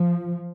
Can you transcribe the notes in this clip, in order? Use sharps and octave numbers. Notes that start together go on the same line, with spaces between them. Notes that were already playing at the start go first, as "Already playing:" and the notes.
Already playing: F3